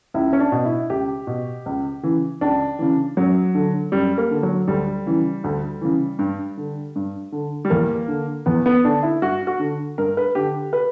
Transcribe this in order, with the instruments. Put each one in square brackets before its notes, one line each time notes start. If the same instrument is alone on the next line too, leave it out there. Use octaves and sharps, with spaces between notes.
[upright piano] C#2 E4
C#4
D4
B2
E4
C#2 G4
B2
C#2
C#3 E3
C#2 D4
C#3 E3
F#2 F#3
D3
F#2 G3
A#3
D3
F#3
D2 G3
C#3 E3
D2
C#3 E3
G2
D3
G2
D3
G3
E2 A#3
D3
E2 B3
B3
D3 D4
E4
G2 F#4
F#4
D3
G2 A#4
B4
D3 G4
B4